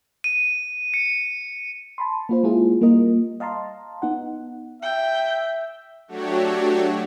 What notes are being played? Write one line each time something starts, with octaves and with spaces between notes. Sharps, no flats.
D#7
C#7
A5 B5 C6
A#3 F4 C5
G#3 A#3 E4 F4 G#4
G3 A#3 F4 A#4 D#5
D#5 F5 A5 A#5 C6
B3 D#4 F#5
E5 G5
F#3 A3 D4 F#4 G4 C#5